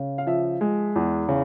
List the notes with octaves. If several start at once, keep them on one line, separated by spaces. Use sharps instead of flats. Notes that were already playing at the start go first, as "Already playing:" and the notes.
Already playing: C#3
F5
F3 E5
G#3
E2
C#3